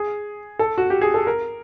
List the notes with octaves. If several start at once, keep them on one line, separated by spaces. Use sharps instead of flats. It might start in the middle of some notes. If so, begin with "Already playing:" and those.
Already playing: G#4
A4
F#4
G4
G#4
A4
A#4